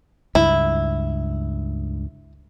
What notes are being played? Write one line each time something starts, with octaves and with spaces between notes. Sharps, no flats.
C#2 G2 E4